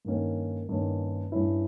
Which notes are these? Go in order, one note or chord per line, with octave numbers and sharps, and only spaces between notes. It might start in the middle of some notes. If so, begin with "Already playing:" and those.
G2 D#3 A#3 C#4
G2 D#3 A#3 C#4
G2 G3 C#4 E4